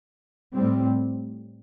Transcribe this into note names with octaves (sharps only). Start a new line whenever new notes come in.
A2 G3 C4